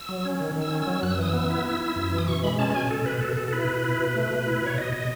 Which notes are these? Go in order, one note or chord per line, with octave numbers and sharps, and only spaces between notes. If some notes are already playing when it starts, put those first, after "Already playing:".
Already playing: E6
F#3
C#4
D#3
D#3
E6
C#4
E6
F#3
F#2 F#6
E6
E3 D#6
B3 E6
E4
E4
E4
F#2
E3
D#6
B2 C#6
G#3 B5
C#4 A5
B2 G#5
B2 A4
B2 B4
B2 A4
B2 A4
A4
E4 B4
B2
E4
B2
A3
B2
E4
B2 C#5
B2 D#5
B2